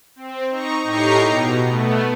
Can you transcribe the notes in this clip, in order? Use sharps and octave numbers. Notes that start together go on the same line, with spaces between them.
C4
D#4 A#5 C#6
A2 D#4 G4 A#5 C#6 C7
B2
A3 B3